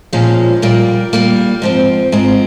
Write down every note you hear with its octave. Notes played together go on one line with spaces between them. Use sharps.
A#2 F3 G#3 C#4
A#2 G3 A#3
A#2 G3 A#3
G#2 F3 C4
G#2 F3 C4